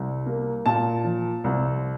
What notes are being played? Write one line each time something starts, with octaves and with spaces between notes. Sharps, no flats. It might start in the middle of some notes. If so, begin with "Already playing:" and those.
Already playing: C2
A#3
A#2 A5
F3
C2